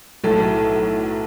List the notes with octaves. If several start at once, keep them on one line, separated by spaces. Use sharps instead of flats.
B1 A2 F#3 A4